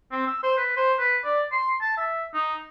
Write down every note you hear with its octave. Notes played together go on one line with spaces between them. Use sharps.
C4
E6
C5
B4
C5
B4
D5
C6
A5
E5
D#4